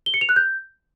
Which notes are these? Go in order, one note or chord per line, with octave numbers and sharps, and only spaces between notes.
G7
C#7
F7
F#6
G6